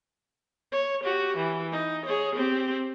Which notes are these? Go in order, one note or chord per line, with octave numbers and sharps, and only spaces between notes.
C#5
F#4 G4
E3
D#4
G#4 C#5
C4 G4